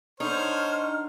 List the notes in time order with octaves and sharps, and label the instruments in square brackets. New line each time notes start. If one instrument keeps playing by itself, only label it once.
[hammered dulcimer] D3 [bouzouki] D#4 [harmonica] C5 C#5 [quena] F6